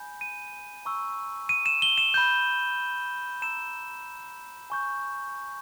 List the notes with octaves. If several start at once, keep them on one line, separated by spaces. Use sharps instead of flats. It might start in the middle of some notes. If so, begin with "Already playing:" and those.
Already playing: G#5 B5 G6
D#7
A#5 C#6 E6
D#7
E7
G7
E7
B5 G6
A#5 E6 G6 E7
G#5 C#6 G6